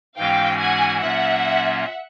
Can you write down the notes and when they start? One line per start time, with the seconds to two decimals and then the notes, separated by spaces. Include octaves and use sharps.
0.18 G#2 E3 G#3 C#4 F#4 F5 G5
0.59 F#5 G#5
1.01 A#2 F#3 A#3 C#4 F4 E5 F#5